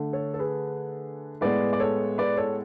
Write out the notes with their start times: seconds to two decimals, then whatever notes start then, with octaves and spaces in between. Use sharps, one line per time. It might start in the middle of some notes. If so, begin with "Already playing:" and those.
Already playing: D3 A3
0.13 A4 C#5
0.34 A4
0.39 G#4 B4
1.41 A2 G#3 B3 B4 D5
1.73 D5
1.80 A4 C#5
2.18 B4 D5
2.37 A4 C#5